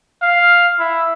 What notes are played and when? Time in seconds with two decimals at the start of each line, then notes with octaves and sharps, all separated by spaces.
0.22 F5
0.79 E4